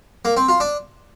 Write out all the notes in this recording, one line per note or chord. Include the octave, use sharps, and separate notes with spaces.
A#3
C4
F4
D4